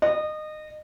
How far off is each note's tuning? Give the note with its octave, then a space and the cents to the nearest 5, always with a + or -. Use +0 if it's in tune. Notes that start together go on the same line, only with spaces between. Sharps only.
D#5 -25